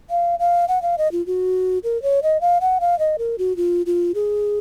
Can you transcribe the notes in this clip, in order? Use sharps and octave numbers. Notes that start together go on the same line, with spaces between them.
F5
F5
F#5
F5
D#5
F4
F#4
A#4
C#5
D#5
F5
F#5
F5
D#5
A#4
F#4
F4
F4
G#4